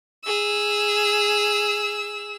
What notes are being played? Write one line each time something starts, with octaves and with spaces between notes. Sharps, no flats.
G#4 E6